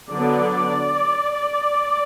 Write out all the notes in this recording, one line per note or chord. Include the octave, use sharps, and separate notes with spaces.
D3 F#3 B3 D4 D5